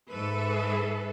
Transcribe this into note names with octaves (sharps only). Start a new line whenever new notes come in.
G#2 A4 B4 E5